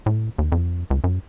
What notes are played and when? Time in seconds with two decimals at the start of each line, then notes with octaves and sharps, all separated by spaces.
0.06 A2
0.38 D#2
0.52 F2
0.90 C#2
1.04 F#2